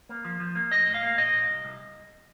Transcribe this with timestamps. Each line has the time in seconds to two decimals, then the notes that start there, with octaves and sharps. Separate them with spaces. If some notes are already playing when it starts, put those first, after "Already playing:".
0.09 A#3
0.25 F3
0.40 F3
0.55 A#3
0.71 A2 D#5
0.87 A2
0.94 F5
1.03 A#3
1.18 A#2 D#5
1.33 A#2
1.49 C2
1.65 C2